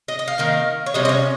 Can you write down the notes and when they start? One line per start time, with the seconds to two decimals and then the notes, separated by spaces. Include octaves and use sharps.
0.08 D#5
0.19 D#5
0.28 F5
0.38 D#3 A#3 D#4
0.86 C#5
0.94 C3 G3 C#4 F4 D#5
1.05 D#5
1.09 C#5